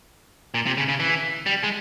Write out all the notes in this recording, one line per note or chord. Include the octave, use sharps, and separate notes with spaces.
A#2
C3
C#3
C#3
E3
G3
G#3